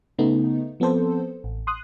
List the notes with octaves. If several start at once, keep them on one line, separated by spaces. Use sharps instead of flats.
C#3 A3 B3 D#4
F3 B3 C4 A4 C5
A1
C6 D#6 F#6